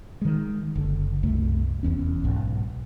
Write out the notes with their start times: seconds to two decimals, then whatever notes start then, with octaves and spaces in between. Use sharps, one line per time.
0.21 D#3 G#3
0.76 F#1 D3
1.23 C2 F#2 A3
1.83 F1 E2 C#4
2.24 B1 G#2